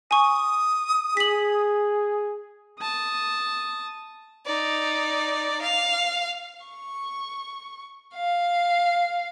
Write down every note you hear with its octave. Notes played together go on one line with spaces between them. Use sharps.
G#5 C#6 D#6
G#4 B6 F#7
A5 D#6
D#4 D5
F5
C#6
F5